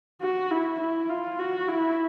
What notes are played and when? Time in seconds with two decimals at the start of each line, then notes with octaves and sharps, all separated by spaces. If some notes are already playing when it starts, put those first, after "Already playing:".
0.22 F#4
0.51 E4
0.81 E4
1.10 F4
1.39 F#4
1.69 E4